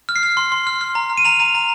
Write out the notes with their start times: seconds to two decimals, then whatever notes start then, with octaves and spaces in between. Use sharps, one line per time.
0.09 F6
0.16 C7
0.23 F6
0.37 C6
0.52 C6
0.67 F6
0.81 F6
0.95 A#5
1.10 F6
1.17 D#7
1.25 A#5 F7
1.40 A#5
1.55 A#5